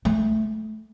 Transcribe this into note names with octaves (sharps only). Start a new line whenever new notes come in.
A3